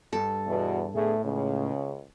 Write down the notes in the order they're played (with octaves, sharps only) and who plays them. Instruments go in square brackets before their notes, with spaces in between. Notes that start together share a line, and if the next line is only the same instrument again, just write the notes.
[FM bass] G2 [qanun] A4
[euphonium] E2 [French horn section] B2
[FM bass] A2 [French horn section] D3 B3 G#4 [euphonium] A3
[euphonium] C#2 [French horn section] C#3